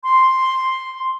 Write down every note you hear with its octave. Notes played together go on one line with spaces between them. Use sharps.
C6